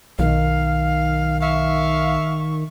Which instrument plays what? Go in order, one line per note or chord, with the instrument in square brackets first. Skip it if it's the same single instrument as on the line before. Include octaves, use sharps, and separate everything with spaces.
[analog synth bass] B1 [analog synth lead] D#3 [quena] F5
[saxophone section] E5 F5 [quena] C#6